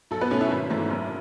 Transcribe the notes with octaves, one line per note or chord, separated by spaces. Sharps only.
B1 A4
B3 B4
B2 A3 C#4 C#5
E4 E5
G#1
G#2 E3 A3
F#1